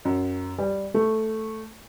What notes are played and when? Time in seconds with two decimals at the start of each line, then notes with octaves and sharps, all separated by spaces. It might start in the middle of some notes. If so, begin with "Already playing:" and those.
0.05 F#2
0.58 G3
0.94 A3